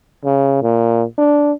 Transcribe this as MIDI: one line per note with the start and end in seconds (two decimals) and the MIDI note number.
0.24 0.59 49
0.62 1.03 46
1.18 1.52 62